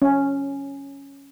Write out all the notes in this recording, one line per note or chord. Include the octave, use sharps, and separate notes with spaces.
C#4